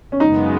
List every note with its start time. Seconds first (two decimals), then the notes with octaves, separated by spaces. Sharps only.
0.12 C#4
0.20 F#2 C#3 G#3 B3 D#4